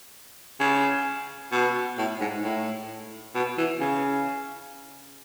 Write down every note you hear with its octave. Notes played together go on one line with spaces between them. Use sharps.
C#3
B2
A2
G#2
A2
B2
E3
C#3